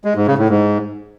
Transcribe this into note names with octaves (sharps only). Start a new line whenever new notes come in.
G#3
G#2
C#3
A2
G#2